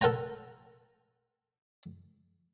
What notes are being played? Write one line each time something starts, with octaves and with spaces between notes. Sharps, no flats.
A4 A#4 F#5 G5 A#5